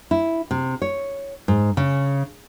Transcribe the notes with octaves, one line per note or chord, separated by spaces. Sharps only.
E4
C3
C#5
G#2
C#3